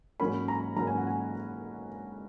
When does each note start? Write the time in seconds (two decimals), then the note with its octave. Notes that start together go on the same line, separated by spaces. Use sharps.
0.20 G#2 F#3 A#3 C#4 B5
0.48 A#5
0.77 G#2 F#3 A#3 C#4 A#5
0.87 G#5
0.97 F#5
1.07 G#5